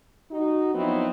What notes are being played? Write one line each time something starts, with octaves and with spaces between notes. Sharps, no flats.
D#4 F#4
F3 F#3 B3 C4 D#4 E4